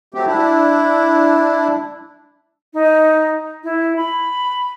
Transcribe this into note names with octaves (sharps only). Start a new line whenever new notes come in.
F#3 A3 C4 G4
D4 E4
D#4
E4
B5